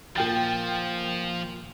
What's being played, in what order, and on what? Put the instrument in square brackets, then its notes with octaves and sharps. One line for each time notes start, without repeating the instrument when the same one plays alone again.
[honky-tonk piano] A#2 G5 A6 [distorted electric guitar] F3